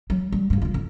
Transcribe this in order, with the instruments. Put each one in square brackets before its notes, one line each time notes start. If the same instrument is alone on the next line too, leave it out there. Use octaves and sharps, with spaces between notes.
[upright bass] F#3
G3
G2 A#3
D1 F4
F2